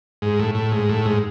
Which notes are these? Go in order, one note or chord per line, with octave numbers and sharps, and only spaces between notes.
G#2
A2
A2
G#2
A2
G#2